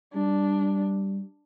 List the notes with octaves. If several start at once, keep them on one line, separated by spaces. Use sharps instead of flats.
G3 D4